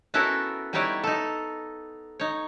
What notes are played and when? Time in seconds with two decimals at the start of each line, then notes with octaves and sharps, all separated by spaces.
0.14 B3 C#4 E4 F#4 A4 A#4
0.73 G3 B3 D#4 E4 C#5 D5
1.04 D#4 A4
2.19 D#4 C#5